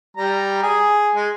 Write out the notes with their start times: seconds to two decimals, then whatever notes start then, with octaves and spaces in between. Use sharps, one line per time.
0.17 G3 A#5
0.63 G#4
1.15 G#3